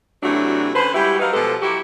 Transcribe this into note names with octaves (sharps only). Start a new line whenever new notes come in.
C3 E3 F#3 A3 D4 F#4
D3 C#4 B4 C5
G3 G#3 E4 F#4 G4
F#3 G3 D#4 A#4 B4 F5
B2 F3 G#3 G4 A4 B4
F#3 E4 F#4 G4